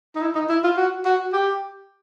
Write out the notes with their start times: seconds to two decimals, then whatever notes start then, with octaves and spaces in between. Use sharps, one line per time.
0.15 D#4
0.21 E4
0.35 D#4
0.49 E4
0.64 F4
0.77 F#4
1.05 F#4
1.33 G4